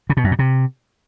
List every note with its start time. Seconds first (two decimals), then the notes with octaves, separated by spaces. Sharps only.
0.10 C#3
0.17 B2
0.24 F#2
0.31 A#2
0.39 C3